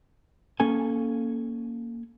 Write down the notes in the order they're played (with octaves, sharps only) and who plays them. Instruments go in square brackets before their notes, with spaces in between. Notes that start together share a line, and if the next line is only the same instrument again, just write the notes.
[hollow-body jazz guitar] A#3 C#4 A4 G#5